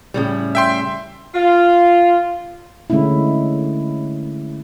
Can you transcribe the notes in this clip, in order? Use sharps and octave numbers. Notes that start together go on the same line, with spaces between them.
A2 C#3 G3
E5 G5 C6
F4
D3 G#3 A3 C#4 E4